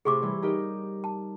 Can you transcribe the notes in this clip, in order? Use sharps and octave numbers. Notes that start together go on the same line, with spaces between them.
A2 C3 G#4 C#6 D6
E3 G3 C#5
D#4 G4 A#4
A5